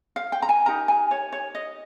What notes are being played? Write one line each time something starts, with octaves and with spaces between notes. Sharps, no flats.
F5
G5
A#5
G#5
D#4 G4 A#4 A#5
G#5
C#5
C#5
D#5